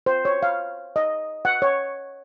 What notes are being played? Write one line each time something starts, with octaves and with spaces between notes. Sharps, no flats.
C5
C#5
F5
D#5
F#5
C#5